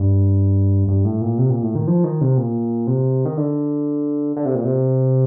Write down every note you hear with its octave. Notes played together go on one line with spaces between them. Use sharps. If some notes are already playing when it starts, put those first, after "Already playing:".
Already playing: G2
G2
A2
A#2
C3
A#2
A2
D#3
F3
D#3
C3
A#2
C3
D#3
D3
D3
C3
A#2
C3